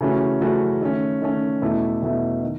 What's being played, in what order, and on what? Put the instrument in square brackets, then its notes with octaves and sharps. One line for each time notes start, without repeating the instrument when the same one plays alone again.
[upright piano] C#3 E3 A3 C#4 F#4
C#3 E3 A3 C#4 F#4
D#3 A3 C#4
D#3 A3 C#4
E2 B2 A3 E4
E2 B2 A3 E4
D#3